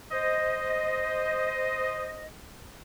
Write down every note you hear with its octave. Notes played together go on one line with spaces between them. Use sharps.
C5 D#5